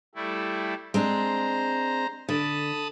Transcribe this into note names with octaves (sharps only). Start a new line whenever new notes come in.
G3 A3 E4
G#3 C4 D4 C5 A#5
D3 A5 B5 D#6